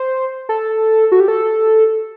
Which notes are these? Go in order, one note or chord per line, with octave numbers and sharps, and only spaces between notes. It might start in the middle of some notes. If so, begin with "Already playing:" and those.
Already playing: C5
A4
F#4
G4
A4